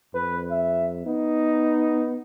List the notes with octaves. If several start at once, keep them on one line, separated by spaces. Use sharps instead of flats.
F2 B4
E5
B3 D#4